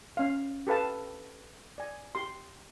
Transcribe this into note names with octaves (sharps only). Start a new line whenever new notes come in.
C#4 F5
G4 A4 B4 F5 A5
D5 G#5
G4 C6